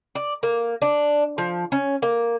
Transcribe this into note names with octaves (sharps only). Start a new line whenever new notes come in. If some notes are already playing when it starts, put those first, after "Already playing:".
D5
A#3
D4
F3
C#4
A#3